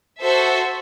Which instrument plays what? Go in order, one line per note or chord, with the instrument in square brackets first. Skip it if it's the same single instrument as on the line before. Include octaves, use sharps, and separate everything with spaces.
[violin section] F#4 A4 C5 E5